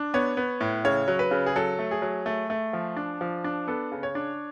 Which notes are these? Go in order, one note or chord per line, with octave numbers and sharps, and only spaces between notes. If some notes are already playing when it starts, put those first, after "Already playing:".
Already playing: D4
B3 C#5
B3
A2
C#3 C#5
F#3
B4
C#3
G#4
F#3 A4
A3
G#4
F#3
A3
A3
F3
D4
F3
D4
B3 A4
C#3
C#5
D4